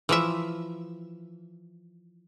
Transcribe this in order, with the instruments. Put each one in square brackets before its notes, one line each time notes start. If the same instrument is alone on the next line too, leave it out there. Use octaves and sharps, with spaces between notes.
[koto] E3 F3 E5